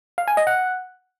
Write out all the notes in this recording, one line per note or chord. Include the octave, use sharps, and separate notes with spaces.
F5
G#5
D#5
F#5